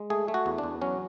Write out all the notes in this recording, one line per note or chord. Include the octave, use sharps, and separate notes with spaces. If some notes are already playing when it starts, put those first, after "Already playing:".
Already playing: G#3
A3 G#4
A3
F#4
E2
D4
E2
F#3 C#4